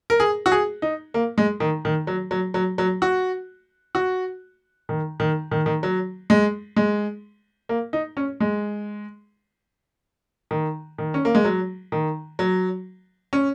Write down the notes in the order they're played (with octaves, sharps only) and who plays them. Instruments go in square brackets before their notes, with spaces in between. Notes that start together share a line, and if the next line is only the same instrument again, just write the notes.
[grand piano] A#4
G#4
F#4
G#4
D#4
A#3
G#3
D#3
D#3
F#3
F#3
F#3
F#3
F#4
F#4
D#3
D#3
D#3
D#3
F#3
G#3
G#3
A#3
D#4
C#4
G#3
D#3
D#3
C#4
A#3
G#3
F#3
D#3
F#3
C#4